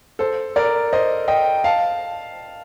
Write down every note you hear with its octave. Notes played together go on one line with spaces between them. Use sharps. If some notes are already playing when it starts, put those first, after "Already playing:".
A4 C5
A#4 D5
C5 D#5
D#5 G5
F5 A5